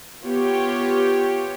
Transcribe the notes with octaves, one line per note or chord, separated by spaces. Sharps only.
B3 F4 G4 C#5 G5